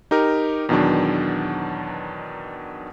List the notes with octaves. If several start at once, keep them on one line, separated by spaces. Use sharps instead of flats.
D#4 G4 A#4
E2 B2 D#3 F#3 D4